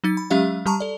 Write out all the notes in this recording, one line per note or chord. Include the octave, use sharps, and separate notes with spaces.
F#3 D#4 A6
B5
F#3 G#3 C#4 G4 E5 F5
G3 G4 A5 A#5 C#6
A4 D5